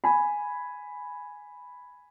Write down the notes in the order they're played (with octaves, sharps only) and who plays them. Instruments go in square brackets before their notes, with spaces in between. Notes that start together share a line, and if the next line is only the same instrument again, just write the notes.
[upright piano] G#5 B5